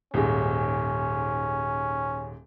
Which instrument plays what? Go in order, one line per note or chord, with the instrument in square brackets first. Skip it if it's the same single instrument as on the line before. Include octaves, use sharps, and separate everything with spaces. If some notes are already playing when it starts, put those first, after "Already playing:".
[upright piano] D#1 G#2 [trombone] C#4